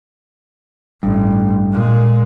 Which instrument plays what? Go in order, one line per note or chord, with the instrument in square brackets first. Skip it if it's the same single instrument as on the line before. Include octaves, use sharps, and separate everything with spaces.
[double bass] A1 [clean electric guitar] G2
[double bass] A#2 G#3